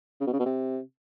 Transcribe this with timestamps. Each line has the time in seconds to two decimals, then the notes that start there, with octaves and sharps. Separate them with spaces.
0.21 C#3
0.27 B2
0.33 C#3
0.39 B2
0.46 C3